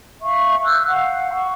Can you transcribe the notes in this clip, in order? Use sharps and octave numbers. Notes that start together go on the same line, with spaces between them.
E5 F5 C#6
E6 F#6 G6
F5 F#5
C#6